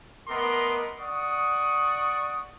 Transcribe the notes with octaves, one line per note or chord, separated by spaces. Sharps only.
A3 B3 A#4 D#5 C6 D6
D5 F#5 C#6 D#6